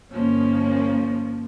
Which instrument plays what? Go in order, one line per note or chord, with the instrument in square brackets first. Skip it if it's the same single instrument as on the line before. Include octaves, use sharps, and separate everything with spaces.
[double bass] G1 C#4 [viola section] F3 A#3